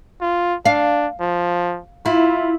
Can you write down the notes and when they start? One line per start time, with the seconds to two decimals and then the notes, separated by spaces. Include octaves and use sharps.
0.21 F4
0.66 D4 F5
1.21 F3
2.06 E4 F4